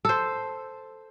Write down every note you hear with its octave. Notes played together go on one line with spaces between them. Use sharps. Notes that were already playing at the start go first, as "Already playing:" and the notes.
A4 C5